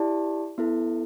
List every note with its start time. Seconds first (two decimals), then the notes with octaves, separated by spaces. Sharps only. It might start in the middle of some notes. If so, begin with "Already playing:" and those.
Already playing: E4 G4 D5 A5
0.58 B3 E4 A4